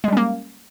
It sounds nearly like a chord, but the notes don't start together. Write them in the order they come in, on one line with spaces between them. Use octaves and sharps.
G#3 G3 C#4 A#3